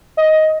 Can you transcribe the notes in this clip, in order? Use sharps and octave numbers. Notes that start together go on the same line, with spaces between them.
D#5